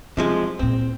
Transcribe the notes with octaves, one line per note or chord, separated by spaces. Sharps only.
C3 F3 G3 G#3
A#2 E3 C4